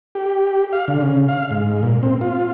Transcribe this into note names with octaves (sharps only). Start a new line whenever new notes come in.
G4
F5
D3
C#3
F5
G#2
A#2
C4
F4